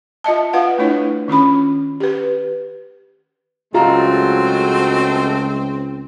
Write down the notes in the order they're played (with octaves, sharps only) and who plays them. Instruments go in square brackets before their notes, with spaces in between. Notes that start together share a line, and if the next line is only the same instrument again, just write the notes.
[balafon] F4 D#5 E5 A5
F4 B4 F5 F#5
A3 D4 E4 C#5
D#3 C#4 F4 B5
G4 B4
[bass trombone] C#2 [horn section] F#3 G#3 A3 [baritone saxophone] C4 [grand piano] F4 A#5